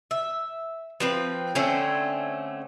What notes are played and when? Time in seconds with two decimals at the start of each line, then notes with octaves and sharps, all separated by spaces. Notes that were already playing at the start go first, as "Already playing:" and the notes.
0.11 E5
1.00 F3 C4 B4
1.55 D3 A3 C4 C#4